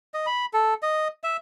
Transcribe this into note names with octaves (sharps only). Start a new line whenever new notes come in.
D#5
B5
A4
D#5
E5